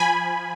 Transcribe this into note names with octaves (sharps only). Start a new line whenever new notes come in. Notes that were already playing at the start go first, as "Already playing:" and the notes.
Already playing: F3 G#5 B5